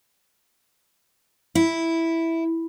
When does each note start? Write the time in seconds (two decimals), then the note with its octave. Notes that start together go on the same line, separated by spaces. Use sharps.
1.55 E4